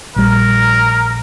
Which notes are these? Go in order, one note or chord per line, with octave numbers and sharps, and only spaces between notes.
A#1 G3 A#4